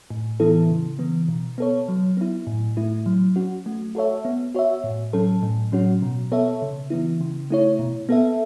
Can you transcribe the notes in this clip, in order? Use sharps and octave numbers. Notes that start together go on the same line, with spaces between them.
A2
E3 B3 E4 A4
C#3
E3 B3
B2
B3 A4 C#5
F#3
B3 E4
A2
A3 E4
F#3
C#4 F#4
A3
F#4 A4 C#5 E5
B3
F#4 C#5 E5
A2
F#3 C#4 A4
A2
F#3 C#4 F#4
B2
B3 A4 C#5 E5
C#3
E3 B3 E4
C#3
A3 E4 C#5
B2
B3 A4 E5